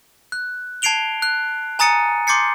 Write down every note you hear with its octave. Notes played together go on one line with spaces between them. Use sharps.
F#6
A5 G#6 C7 D7 F7 G7
F#6
G#5 A#5 D#6 A6 C#7 D#7
C6 D6 G6 A6 C7 C#7